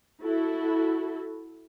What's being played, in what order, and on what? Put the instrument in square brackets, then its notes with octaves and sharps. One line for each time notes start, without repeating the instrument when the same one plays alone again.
[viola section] E4 F#4 A4